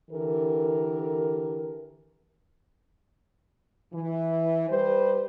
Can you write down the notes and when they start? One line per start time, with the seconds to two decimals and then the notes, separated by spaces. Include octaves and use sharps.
0.11 D3 E3 G4 A4 A#4
3.93 E3
4.68 G3 B4 C5